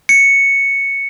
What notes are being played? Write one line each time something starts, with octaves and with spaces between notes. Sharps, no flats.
C#7